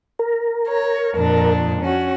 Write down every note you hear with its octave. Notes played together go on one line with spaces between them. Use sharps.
A#4
C#5
F2 A#2 D4
C#4 F#4